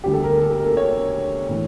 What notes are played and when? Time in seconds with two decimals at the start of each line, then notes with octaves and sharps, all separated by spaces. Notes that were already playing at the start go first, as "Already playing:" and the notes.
0.04 D2 D3 G3 G4
0.13 A4
0.24 A#4
0.42 A4
0.60 A#4
0.77 C#5
1.49 A2 E3